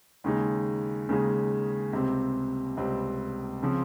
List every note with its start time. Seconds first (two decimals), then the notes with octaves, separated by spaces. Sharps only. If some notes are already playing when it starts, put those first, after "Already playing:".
0.24 D#2 C#3 G#3 D#4 G#4
1.09 D#2 C#3 G#3 D#4 G#4
1.93 C#2 C3 G3 C4
2.77 C#2 C3 G3 C4
3.63 C#3 F3 C4